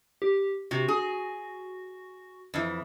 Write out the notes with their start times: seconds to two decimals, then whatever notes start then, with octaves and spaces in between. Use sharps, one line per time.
0.22 G4
0.71 C3 F#4
0.88 G#4
2.54 F2 E3